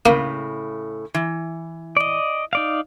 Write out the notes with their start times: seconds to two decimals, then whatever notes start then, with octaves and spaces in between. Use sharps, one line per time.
0.06 A2 C#3 A#3
1.14 E3
1.97 D5 D#5
2.53 D#4 D5 F5